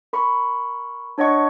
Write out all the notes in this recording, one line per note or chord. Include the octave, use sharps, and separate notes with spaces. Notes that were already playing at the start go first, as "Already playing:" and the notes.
A#4 B5 C#6
D4 C#5 D#5 F#5 C#6